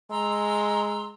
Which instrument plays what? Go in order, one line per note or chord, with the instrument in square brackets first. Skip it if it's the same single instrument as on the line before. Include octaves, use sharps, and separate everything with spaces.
[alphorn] G#3 [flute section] A#5 C6 E6